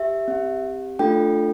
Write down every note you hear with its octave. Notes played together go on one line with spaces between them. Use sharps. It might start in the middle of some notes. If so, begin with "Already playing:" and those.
Already playing: G4 E5
C4 G4
A3 D4 F4 A4 G5